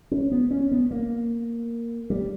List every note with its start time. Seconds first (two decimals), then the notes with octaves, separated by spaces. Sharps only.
0.11 C#4
0.32 B3
0.51 C#4
0.72 B3
0.91 A#3
2.10 G3